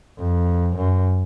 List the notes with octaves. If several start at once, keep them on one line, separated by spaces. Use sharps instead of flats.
F2
F#2